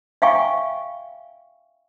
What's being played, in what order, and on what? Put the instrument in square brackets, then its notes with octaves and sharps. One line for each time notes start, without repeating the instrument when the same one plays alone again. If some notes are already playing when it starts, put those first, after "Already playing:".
[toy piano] E5 F5 G5 G#5 C#6